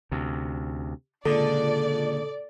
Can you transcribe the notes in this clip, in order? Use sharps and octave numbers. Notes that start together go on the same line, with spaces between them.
D2 C3
C#2 A#2 D3 A4 D5